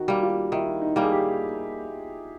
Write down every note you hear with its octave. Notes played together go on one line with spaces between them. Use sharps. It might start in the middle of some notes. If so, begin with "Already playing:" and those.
Already playing: D#3 F#4
G3 A#3
F4
D#3 E4
D#4
G3 A#3
G#4
G4